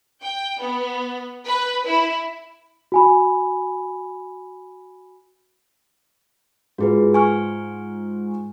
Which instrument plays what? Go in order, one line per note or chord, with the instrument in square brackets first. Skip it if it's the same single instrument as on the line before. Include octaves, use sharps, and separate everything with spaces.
[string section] G5
B3
B4
E4
[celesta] F#4 G#5 B5
[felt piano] G#2 F4 [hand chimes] F#4 G#4 B4
[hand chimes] G#5 C#6 F6